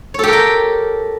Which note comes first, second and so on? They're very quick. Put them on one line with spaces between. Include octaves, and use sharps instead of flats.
C#5 A4 G4 A#4 G5